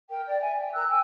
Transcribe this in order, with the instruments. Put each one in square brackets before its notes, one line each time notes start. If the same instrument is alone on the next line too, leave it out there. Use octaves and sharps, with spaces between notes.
[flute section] A#4 G5
D5 G5
E5 G#5
G5
A#4 A#5 E6 F#6
G5 G#5 E6